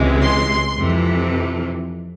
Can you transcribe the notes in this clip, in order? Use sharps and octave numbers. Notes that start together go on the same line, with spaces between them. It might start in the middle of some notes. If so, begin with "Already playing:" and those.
Already playing: C#2 C3 E3 G#3
C6
F2 C3 E3